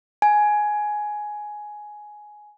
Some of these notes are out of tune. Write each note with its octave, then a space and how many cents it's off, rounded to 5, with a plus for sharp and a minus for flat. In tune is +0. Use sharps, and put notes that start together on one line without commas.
G#5 +10